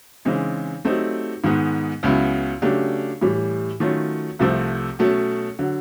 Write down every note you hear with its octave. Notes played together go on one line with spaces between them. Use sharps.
C#3 E3 G#3 C4 D#4
F#3 A3 C4 D#4 G4
G#2 D#3 G#3 B3
C#2 C#3 F#3 B3 E4
C#3 F#3 A3 D4 G4
A2 E3 G3
D#3 F#3 A3 C#4 F4
C2 C3 F3 A3 C4
B2 F#3 A3 C#4
D3 F#3